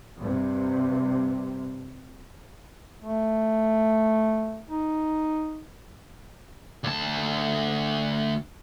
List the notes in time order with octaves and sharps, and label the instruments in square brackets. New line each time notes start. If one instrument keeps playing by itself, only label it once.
[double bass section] G2 C3
[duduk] A3
D#4
[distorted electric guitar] D2 A5